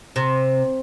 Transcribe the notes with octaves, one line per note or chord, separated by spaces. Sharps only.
C3